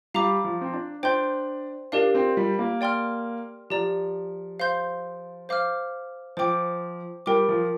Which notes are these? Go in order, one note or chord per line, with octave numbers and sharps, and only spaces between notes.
G3 F5 A#5 D6
F3
C4
D4
D4 C5 G5 C6 G6
D4 G4 A#4 D5 F5
C4
G3
A#3
D5 G5 C6 F6
F3 G4 D5 A#5
C5 F5 C6 G6
C5 F5 D6 F6
F3 C5 G5 D6
G3 A#4 G5 D6
F3